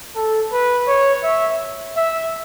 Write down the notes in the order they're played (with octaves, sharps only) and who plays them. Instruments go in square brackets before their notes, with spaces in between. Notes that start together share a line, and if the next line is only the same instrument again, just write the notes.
[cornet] A4
B4
C#5
E5
E5